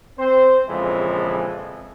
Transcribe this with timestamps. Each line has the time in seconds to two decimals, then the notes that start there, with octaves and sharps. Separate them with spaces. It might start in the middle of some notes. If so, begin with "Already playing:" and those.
0.18 C4 C5
0.68 A#1 F2 C#3 E3 F3 G#3